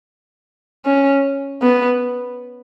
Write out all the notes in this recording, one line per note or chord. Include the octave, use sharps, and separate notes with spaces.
C#4
B3